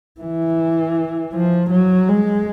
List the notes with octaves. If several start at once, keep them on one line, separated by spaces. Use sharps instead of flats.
E3
F3
F#3
G#3